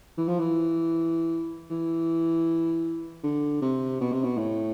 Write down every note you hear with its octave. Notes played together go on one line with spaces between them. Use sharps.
E3
F3
E3
E3
D3
C3
B2
C3
B2
A2